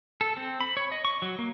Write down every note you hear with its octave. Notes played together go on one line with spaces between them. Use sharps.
A4
C4
B5
C#5
D#5
C#6
F#3
A#3